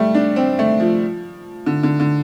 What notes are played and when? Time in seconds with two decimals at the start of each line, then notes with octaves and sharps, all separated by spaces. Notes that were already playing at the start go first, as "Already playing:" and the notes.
Already playing: G3 A3
0.15 D4
0.36 C4
0.59 A3
0.80 F3
1.66 D3
1.83 D3
2.00 D3